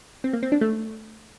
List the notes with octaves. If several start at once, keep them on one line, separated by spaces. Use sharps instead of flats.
C4
A#3
C4
D4
A3